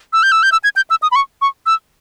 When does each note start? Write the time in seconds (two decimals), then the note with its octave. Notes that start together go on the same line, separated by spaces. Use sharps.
0.13 E6
0.23 G6
0.32 E6
0.43 G6
0.52 E6
0.64 G#6
0.76 G6
0.90 E6
1.02 D#6
1.12 B5
1.16 C#6
1.42 C#6
1.66 E6